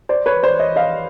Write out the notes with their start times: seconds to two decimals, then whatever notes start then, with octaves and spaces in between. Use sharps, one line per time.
0.09 C5 D5
0.26 B4 C#5
0.43 C5 D5
0.59 C#5 D#5
0.76 D#5 F5